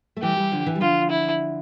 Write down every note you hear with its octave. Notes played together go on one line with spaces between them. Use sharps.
A3
E3 G3 G4
E3 G3
D3 F3
E3
G3
D3 F3 F4
E4